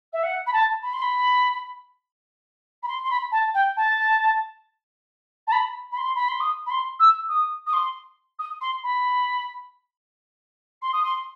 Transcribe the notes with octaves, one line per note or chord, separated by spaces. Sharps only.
E5
F#5
B5
A5
B5
C6
B5
B5
C6
C6
B5
A5
G5
A5
A5
B5
B5
C6
B5
C6
D#6
B5
C6
E6
D#6
D#6
C6
D#6
C6
B5
C6
D#6
C6